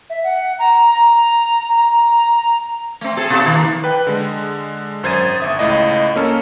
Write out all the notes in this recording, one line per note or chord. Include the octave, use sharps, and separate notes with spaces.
E5
F#5
A#5
A#5
A#5
A3 C4
G#4 A4
B2 A4
D#3 E3 A#3
B4 G5
D3 G#3
G#1 F#2 C5 G#6 A6 D#7
G1 E5 D#6
C#2 A2 D#5
A#3 C#4 A4 F6